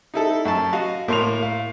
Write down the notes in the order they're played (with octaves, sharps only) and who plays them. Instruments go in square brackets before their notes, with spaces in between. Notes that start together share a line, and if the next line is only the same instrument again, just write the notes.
[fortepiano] D#4 E4 A4
F#2 A5
F#4 D#5 F5
[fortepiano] A2 [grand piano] A#3 C6 F7
[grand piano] F5